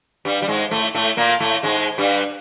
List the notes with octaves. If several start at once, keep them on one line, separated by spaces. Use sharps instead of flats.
G2 G3
G3
G#2 G#3
A2 A3
A2 A3
A#2 A#3
A2 A3
G#2 G#3
G2 G3